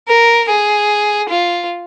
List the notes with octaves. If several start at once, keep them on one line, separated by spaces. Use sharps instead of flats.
A#4
G#4
F4